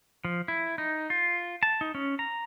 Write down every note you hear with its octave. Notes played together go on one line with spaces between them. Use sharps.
F3
E4
D#4
F4
A5
D#4
C#4
A#5